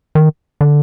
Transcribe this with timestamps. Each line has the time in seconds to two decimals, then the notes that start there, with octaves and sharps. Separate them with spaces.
0.15 D#3
0.61 D3